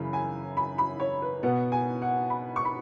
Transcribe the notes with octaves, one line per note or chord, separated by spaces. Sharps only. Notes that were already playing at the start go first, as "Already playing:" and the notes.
Already playing: F#2 C#3 E3 C#4 B5
G#5
B5
B5
C#5
B4
B2 B3 F#5
G#5
F#5
B5
C#6
B5